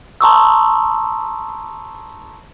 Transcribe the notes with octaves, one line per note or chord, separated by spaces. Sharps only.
A5 A#5 C6 C#6 D#6 E6